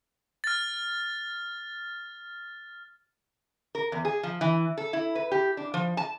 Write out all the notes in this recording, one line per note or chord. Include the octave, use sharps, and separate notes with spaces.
F6 A6
A#4
E2
G#4
F3
E3
A4
E4
B4
G4
D4
F3
A5